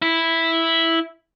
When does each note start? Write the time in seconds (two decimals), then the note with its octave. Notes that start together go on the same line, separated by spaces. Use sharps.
0.02 E4